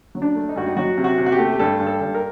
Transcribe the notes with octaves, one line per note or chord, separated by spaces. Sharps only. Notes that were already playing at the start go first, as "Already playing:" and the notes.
F#3
D4
A3
D#4
G2 F#4
D#4
F#3 F#4
C3
F#4
C3
F#4
G4
A3
G4
G2 A4
G2
A4
G2
A#4